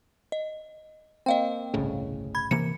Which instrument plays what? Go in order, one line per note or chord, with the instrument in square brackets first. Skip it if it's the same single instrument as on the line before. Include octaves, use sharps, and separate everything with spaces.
[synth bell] D#5
[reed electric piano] A#3 C4 [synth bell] D#5 F5 G5
[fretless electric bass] G1 C2 A2 [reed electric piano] C#3
[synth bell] B5 G#6
[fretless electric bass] C3 E3 A#3 [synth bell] C#7